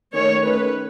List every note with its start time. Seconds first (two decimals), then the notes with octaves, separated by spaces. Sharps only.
0.14 D#3 A3 C#4 C#5
0.44 D#3 A3 C#4 B4